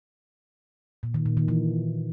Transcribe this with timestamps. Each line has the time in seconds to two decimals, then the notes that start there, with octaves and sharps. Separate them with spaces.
1.03 A#2
1.14 D#3
1.26 A#2
1.37 D#3
1.48 E3